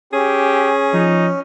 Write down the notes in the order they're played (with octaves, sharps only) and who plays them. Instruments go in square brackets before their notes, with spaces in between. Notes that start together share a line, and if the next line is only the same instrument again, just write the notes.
[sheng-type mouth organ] C#4 [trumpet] G4 [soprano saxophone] G#4
[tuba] F3 [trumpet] D#4